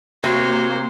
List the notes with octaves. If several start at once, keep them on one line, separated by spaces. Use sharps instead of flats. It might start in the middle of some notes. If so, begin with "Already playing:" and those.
C3 A#3 F#4 C5 C#5